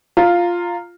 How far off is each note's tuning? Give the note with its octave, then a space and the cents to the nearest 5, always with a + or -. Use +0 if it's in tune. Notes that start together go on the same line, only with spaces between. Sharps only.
F4 +0 A#5 -15